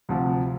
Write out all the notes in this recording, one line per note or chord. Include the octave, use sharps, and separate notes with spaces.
D2 C3 F3